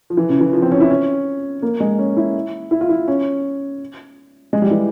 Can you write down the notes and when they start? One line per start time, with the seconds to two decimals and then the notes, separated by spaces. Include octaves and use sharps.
0.10 F3
0.17 E3
0.29 C#3
0.41 E3
0.53 F3
0.62 C4
0.71 C#4
0.80 E4
0.90 C#4
1.62 A#3
1.80 G#3
1.99 C#4
2.17 E4
2.71 E4
2.81 F4
2.89 E4
3.08 C#4
4.53 G#3
4.62 G3
4.71 E3